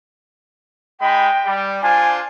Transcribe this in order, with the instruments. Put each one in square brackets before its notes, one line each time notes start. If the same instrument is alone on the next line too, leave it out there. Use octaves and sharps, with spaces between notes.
[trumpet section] G#3 D#4 B5 [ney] G5
[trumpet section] G3
[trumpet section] D4 F4 C5 [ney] G#5